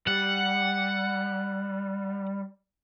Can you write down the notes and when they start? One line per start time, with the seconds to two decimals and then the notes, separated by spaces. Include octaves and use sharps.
0.07 G3 F#5